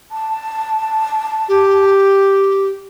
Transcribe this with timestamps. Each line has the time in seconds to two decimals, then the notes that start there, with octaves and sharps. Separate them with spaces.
0.11 A5
1.49 G4